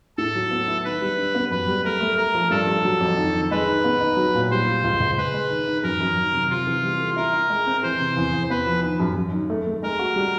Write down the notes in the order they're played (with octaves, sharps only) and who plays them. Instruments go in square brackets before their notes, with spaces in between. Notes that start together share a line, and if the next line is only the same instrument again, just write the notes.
[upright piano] A2 [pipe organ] A4
[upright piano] F#3
B3
E4
[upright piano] D#3 [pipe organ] B4
[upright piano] G3
D4
B3
[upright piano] F#2 [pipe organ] B4
[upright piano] G3
[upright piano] A3 [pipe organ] A#4
[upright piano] A3
[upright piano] A3 [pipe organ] A#4
[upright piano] F3
[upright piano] G2 [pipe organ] A4
[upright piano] G2
F#3
F2
D#3
D#3
[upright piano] G#3 [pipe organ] B4
[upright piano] D#3
B3
D#4
F#3
A#2
[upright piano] G3 [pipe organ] C5
[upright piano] F4
C#2
C#2
[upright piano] G#3 [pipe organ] B4
[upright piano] G#3
D#3
D#3
[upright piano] F#2 [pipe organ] A#4
[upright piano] F#2
D#3
C3
[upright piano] C3 [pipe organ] F4
[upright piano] E3
G3
A4
[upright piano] E4 [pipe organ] A#4
[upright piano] E4
G#3
C4
[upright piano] E3 [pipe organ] C5
[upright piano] C3
E2
E2
[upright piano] B3 [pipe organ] B4
[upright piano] F3
D#3
F#2
F#2
D#3
A3
A3
[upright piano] G#3 [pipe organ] A#4
[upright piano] F#4
G3